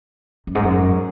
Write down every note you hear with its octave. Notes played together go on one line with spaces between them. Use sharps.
F#2
G#2
F#2